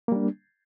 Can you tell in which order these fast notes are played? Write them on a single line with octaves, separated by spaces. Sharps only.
A#3 G3 D4